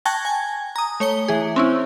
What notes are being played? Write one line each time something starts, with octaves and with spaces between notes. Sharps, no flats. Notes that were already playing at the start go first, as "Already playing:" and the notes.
G5 A5 C#6 F#6 G#6 A#6
G#5 G#6
A#5 D#6
A3 C#5 C#7 G7
E3 G#4
C4 C#4 E4